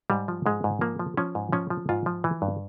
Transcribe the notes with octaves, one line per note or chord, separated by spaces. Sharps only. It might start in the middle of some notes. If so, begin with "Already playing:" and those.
G#2 G3
F3
G#2 G#3
G#2
F3 A#3
F3
F3 C#4
G#2
F3 C#4
F3
G#2 F4
F3
E3
G2